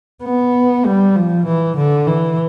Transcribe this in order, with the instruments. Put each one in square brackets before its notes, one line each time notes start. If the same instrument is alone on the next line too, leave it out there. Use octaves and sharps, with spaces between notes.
[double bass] B3
G3
F3
E3
D3
E3